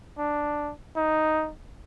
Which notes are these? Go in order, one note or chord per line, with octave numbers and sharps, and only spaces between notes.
D4
D#4